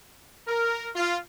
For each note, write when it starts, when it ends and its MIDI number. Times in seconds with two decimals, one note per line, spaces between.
0.48 0.89 70
0.96 1.17 65